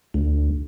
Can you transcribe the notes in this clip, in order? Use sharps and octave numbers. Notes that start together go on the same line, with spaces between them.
D2